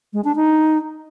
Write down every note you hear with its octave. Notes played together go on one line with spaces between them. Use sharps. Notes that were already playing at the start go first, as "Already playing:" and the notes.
G#3
D4
D#4